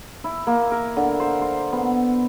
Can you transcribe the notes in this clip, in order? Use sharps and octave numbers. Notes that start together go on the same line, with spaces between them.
E4
A#3
A#4
D3
C5
C5
B3